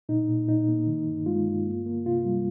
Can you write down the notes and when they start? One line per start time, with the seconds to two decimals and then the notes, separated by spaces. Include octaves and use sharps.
0.09 A#2 D#4
0.29 A#2
0.48 A#2 D#4
0.68 A#3
0.87 D#3
1.07 G2
1.26 G#3 F4
1.46 G2
1.66 A#3
1.86 A#3
2.06 C3 F4
2.25 G3